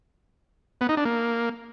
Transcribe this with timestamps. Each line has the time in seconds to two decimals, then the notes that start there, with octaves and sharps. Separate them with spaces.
0.81 B3
0.89 D#4
0.97 D4
1.05 A#3